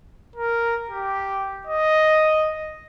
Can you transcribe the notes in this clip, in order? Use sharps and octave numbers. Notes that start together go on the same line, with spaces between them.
A#4
G4
D#5